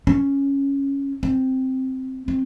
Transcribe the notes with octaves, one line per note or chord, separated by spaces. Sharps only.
C#4
C4
C4